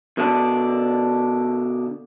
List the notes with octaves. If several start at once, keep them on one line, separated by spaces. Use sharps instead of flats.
B2 D3 D4